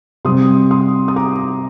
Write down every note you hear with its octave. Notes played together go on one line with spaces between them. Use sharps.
C3 G3 C4 C6 D#6
C6 D#6
D#6
A#5 D6